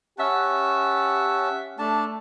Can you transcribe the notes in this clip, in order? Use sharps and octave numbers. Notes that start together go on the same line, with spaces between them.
C#4 G4 E5 F#5 A5
A3 D4 A5